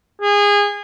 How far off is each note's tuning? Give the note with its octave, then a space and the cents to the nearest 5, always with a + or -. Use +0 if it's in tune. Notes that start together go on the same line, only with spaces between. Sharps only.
G#4 -25